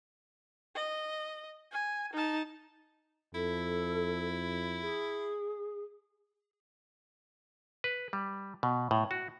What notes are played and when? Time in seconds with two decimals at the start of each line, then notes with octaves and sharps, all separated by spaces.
0.75 D#5
1.72 G#5
2.13 D#4 A5
3.34 F2 E4 A4
4.82 G#4
7.84 B4
8.13 G3
8.63 B2
8.91 A2
9.11 F#4